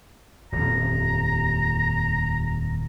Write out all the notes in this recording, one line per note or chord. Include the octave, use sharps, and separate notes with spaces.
D#1 F2 A#5